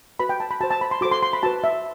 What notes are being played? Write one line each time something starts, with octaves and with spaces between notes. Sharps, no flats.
F#4 B4 B5
G5
A5
B5
F#4 C5 A5
A5
B5
C6
F#4 A4 C5 D6
C6
C6
B5
F#4 B4 A5
E5